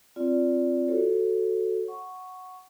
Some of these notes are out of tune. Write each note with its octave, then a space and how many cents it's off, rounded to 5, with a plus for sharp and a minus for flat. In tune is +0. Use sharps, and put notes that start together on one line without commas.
C4 +0 F4 -15 D5 -15
F#4 +0 A4 +0 C#5 -35
F#5 +0 C#6 +0